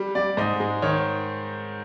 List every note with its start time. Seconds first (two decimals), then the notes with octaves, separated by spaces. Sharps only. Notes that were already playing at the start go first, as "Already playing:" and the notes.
Already playing: G3
0.15 G3 D5
0.37 G#2 D#5
0.60 G#3
0.82 D#3 C#5